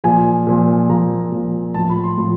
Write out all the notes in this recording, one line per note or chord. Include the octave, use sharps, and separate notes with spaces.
A#2 F3 G#5
A#2 F3
A#2 F3 A#5
A#2 F3
A2 F3 A5
B5
C6
A2 F3